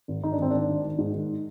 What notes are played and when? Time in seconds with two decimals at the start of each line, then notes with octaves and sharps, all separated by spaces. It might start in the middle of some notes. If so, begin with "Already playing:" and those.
0.08 G#1
0.23 G#1 D#4
0.33 D4
0.38 G#1 C4
0.51 G#1 D4
0.69 D#3
0.84 D#3
0.98 G#2
1.14 D#3